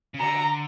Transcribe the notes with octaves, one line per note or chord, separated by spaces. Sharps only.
C#3
D3 A#5